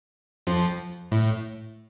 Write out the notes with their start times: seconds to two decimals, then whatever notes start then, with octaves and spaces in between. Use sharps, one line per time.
0.47 F2 F3
1.12 A2